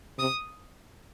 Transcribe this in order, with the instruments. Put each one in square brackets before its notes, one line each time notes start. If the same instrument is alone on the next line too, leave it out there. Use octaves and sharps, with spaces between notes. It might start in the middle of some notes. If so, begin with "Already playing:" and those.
[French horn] C3 [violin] D#6